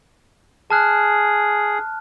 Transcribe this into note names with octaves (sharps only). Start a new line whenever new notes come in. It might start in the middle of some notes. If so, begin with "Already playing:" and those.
G#4 A5 F6 F#6